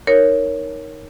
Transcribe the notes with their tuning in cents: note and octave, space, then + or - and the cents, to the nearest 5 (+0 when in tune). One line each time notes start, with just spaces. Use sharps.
D#4 +0 A#4 +0 C#5 +0